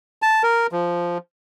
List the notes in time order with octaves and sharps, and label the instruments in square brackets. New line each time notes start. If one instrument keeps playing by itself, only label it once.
[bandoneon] A5
A#4
F3